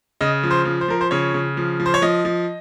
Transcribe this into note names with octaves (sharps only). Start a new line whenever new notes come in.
C#3 D#5
F3
C5
F3
C5
F3 A#4
C5
C#3 C#5
C#3
F3
F3
C5
C#5
F3 D#5
F3